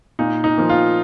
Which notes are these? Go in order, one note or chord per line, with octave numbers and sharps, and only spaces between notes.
A#2 D#4
D#4
F3 A#3
F4